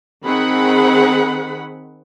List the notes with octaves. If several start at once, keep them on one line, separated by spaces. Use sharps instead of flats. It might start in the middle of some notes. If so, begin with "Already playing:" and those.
D#3 C4 G#4 F#5 B5